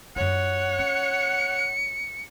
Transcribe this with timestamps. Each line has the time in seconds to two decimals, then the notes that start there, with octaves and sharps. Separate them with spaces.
0.16 F#2 F4 C#5 F#5
0.78 C#4 C#7